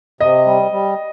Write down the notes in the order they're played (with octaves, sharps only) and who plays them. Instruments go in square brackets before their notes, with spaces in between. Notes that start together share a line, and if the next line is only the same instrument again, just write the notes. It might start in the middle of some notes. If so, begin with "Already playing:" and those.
[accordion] C3 [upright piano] D#5
[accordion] G3
G3